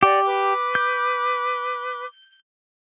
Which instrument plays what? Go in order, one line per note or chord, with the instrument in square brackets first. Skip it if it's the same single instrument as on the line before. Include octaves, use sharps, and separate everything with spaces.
[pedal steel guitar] G4 [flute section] D5 D#5 F#5
[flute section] B4 D6
[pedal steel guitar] G6